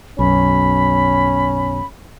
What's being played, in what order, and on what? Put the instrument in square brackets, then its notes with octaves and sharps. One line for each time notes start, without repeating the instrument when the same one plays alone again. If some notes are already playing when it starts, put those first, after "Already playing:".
[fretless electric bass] B1 F#2 [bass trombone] C#4 [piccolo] B5